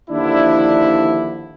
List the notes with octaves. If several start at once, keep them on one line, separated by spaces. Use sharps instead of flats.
D#2 D3 F3 D4 E4